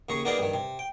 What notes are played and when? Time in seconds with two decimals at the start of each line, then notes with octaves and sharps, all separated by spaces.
0.09 D#2 C#3 G#4 A#5 C#6
0.25 A#3 B3 D#4 G#4 D5 F5
0.38 G2 D#3
0.54 C3
0.79 G5